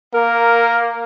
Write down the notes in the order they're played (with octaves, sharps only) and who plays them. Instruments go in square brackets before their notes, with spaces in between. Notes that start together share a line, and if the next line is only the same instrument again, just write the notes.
[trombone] A#3 [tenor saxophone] A#4